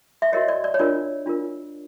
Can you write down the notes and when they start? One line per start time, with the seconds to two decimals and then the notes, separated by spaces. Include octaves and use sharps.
0.22 E5
0.32 F#4 A#4 C#5 D#5
0.48 D5
0.64 D5
0.74 C#5
0.79 D4 F4 A#4 D5
1.26 D4 F4 A#4